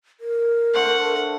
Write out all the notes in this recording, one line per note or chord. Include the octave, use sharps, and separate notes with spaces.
A#4
D3 A3 C5 F#5